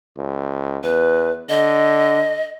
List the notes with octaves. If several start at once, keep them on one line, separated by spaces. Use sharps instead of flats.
C#2
E2 B4
D3 D#5